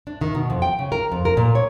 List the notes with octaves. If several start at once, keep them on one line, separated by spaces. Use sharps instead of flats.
D4
D#3
B2
F2
G5
C#3
A#4
F2
A#4
A#2
C#5